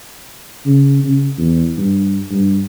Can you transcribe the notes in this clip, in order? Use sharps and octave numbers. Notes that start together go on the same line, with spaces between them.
C#3
C#3
E2
G2
G2